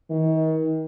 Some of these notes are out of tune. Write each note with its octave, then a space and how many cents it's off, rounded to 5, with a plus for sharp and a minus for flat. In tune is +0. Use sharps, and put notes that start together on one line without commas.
D#3 +35